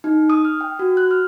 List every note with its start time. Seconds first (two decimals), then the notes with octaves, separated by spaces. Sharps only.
0.04 D#4
0.30 D#6
0.45 F6
0.61 G5
0.79 F#4
0.97 F#6
1.11 F6